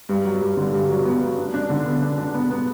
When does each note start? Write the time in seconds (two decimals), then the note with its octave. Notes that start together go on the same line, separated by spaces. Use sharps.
0.09 G2
0.25 F#3
0.41 G2
0.57 D3
0.73 G2
0.89 F#3
1.05 B3
1.21 F#3
1.38 D4
1.54 D4
1.70 D3
1.86 B3
2.02 D4
2.18 D4
2.34 B3
2.51 B3